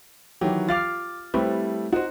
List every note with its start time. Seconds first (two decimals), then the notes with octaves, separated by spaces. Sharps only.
0.41 D#3 E3 F#3 G4
0.69 F4 F5 D6 F6 A6
1.34 G3 A3 C4 E4 G4 B4
1.93 D#4 F#4 C5